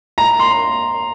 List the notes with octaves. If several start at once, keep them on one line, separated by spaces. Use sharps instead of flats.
A#5
C6